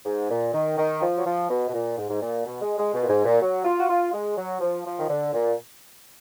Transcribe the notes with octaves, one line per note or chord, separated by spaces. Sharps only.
G#2
A#2
D#3
D#3
F3
F#3
F3
B2
B2
A#2
G#2
G#2
A#2
B2
G#3
G#3
B2
A#2
G#2
A#2
F#3
F4
F#4
F4
G#3
F#3
F3
F3
D#3
D3
A#2